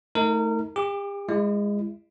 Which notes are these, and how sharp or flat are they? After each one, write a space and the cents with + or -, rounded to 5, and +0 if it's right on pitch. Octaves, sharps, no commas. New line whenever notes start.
A3 +0 D#4 +35 A#4 -30
G4 +40 D6 +0
G#3 -20 E4 +25